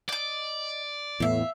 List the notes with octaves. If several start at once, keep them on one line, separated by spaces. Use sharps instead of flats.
D5 D#5 D6
E2 A2 B3 E5 F5